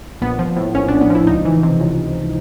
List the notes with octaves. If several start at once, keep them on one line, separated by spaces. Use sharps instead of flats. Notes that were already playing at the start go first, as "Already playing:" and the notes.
A#1 B3
F3
A2
A#1 C#4
A#1 D4
B3
F3 E4
C#2 D#4
E3
C3
C#2